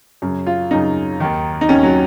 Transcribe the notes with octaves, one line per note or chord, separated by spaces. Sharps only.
F#2 C#3
F4
F#2 C#3 D#4
D#2 D#3
D#4
D#2 D#3 C#4
F#3